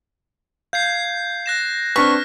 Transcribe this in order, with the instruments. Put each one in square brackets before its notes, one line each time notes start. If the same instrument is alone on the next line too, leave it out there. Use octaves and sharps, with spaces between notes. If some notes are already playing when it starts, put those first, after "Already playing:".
[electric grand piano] F5 [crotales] G6 G#6 C7
[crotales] F#6 A#6 E7
[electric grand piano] C4 D4 B4 [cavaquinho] C#6 [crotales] F6 B6